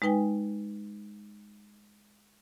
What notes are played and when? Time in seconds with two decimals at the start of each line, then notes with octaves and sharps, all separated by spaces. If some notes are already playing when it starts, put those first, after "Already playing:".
0.02 G#3 D#4 B4 G5 G#5